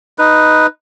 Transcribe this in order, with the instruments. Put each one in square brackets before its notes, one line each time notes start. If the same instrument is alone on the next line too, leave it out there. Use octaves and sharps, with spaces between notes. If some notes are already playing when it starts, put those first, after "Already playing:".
[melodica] D#4 B4